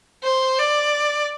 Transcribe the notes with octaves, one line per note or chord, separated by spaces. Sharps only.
C5
D5